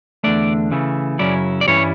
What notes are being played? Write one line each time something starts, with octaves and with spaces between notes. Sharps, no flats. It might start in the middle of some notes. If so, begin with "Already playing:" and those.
E2 D3 A3 D4 D5
C#3 E3 A3
F#2 C#3 F#3 C#4 E4 D5
D5
G2 E3 G3 C#4 E4 C#5